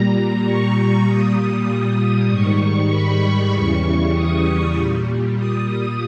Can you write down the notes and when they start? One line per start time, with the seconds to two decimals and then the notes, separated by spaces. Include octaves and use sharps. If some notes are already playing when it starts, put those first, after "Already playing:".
Already playing: A#2 G3 A#5
0.44 C#6
1.06 A#2 G3 D#6
2.29 G#2 D#3 G3 C#6
2.90 B5
3.52 E2 C#3 E3 G3 C#6
4.14 D#6
4.75 A#2 G3
5.36 D#6